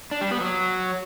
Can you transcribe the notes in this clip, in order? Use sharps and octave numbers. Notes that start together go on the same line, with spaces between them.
D4
G3
B3
F#3